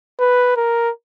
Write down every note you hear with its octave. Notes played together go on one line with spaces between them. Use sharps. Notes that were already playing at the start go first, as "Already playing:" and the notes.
B4
A#4